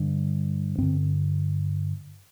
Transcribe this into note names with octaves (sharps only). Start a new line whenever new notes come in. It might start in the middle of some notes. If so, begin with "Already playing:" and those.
Already playing: G2 D3
G2 D3 C4